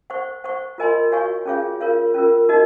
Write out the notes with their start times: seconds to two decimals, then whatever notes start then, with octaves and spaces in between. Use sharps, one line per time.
0.10 C5 F#5 C#6
0.44 C5 F#5 C#6
0.78 F4 A#4 D#5 G#5 C6
1.12 F#4 C#5 F5 G#5 C#6
1.46 C#4 F4 G#4 C#5 F5
1.80 F4 A#4 C#5 F5
2.14 C#4 F4 A#4
2.49 D#4 F#4 A#4 D#5